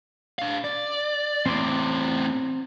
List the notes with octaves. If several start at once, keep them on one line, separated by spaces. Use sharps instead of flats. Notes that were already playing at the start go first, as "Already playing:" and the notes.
D4 F5
D5
E2 A2 C4 C6 D6